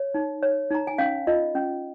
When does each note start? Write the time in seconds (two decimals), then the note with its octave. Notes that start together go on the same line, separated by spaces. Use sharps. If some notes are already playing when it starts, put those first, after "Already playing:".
Already playing: C#5
0.14 D#4
0.42 C#5
0.71 D#4 A#5
0.87 G#5
0.98 C#4 F5
1.27 F4 D#5
1.55 C#4